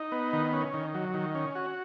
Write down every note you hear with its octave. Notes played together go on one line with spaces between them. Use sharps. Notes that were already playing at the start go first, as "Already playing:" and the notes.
Already playing: D#4
B3
D#3
C#4
D#3
F#3
D#3
C#4
F#4